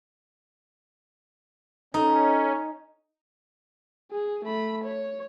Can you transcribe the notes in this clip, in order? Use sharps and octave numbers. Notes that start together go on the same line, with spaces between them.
C#4 D#4 A4 D#5
G#4
A3 B5
C#5